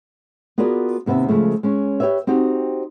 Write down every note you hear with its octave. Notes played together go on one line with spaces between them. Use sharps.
B3 F4 F#4 G#4 A#4 D5
D#2 C3 B3 C4 E5
C#3 F3 G#3 A3
G#3 C#4
G4 A#4 B4 C#5 E5
C4 D#4 F#4 G4